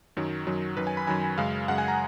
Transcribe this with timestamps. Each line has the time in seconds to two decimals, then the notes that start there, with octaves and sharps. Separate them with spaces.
0.17 F#2 D#3 F#3
0.47 F#2 D#3 F#3
0.77 F#2 D#3 F#3 B4
0.87 G#5
0.97 B5
1.07 F#2 D#3 F#3 G#5
1.38 F#2 C#3 G#3 F5
1.68 F#2 C#3 G#3 F#5
1.78 G#5
1.88 A#5